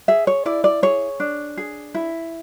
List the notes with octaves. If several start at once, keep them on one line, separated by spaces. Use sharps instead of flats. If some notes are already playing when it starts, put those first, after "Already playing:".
G#4 E5
C#5
E4 D5
D5
G#4 C#5
D4
G#4
E4